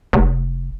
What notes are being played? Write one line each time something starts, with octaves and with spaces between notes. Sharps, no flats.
F1